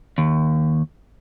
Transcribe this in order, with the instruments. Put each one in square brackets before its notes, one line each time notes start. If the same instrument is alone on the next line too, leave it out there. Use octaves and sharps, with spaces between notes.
[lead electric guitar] D#2